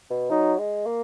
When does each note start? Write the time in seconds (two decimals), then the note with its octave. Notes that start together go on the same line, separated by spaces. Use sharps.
0.10 B2
0.31 F#3 D#4
0.58 G#3
0.86 A#3